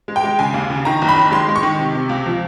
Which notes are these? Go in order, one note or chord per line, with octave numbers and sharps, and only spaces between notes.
G#3
G5
G#3
C#3 G#5
D#2
C#3
D#3 A#5
F#1
B5
D#3
G#3 C6
G#3
C#6
D#3
C3
C3
C#2
F3